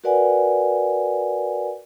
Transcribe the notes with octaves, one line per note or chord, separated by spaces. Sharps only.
F#4 A#4 B4 D5 F#5 G#5